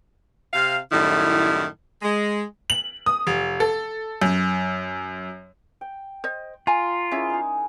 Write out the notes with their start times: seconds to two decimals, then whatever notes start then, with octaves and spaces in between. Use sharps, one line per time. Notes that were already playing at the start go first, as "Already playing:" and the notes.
0.54 C3 F5
0.92 F#2 A2 D#3 G3 E4
2.03 G#3
2.70 F#7
3.06 D#6
3.27 F1
3.60 A4
4.22 F#2
5.81 G5
6.24 C5 D#5
6.67 F4 G#5 A#5
7.11 G#3 C#4 E4 A#4 C#5 E5
7.30 D#4 G#4